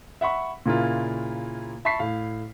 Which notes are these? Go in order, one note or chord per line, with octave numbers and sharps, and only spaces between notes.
E5 F#5 B5 C#6
A#2 C#3 A#3 E4 F4
E5 A5 B5 C#6 B6 C7
A2 F5